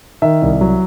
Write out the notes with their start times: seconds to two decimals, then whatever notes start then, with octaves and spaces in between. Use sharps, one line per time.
0.22 D#3 E5
0.42 C2
0.61 F#3